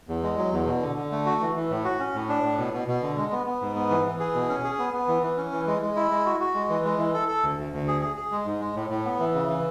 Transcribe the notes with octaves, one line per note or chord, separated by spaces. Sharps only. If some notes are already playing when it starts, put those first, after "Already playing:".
E2
G#3
F#3
E2
B2
D3
D3
A3
F#4
E3
E3
A2
F#4
C#4
A2
D4
A2
B2
B2
B2
D3
G#3
B3
B3
G#2
B3
E3
E3
G#4
B2
C#4
G#4
B3
B3
E3
E3
C#4
E3
G#3
G#3
E4
G#3
F#4
F#4
G#3
E3
G#3
E3
A4
A4
D2
D2
D2
G#4
G#4
G#4
G#3
G#2
G#3
A2
A2
B3
E3
C#3
E3